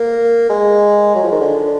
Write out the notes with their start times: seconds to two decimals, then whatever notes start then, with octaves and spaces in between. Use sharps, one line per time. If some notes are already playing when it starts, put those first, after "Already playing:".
Already playing: A#3
0.50 G#3
1.15 F#3
1.23 F3
1.32 D#3
1.41 D3